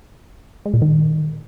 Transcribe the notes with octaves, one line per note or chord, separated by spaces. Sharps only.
G#3
A#2
D#3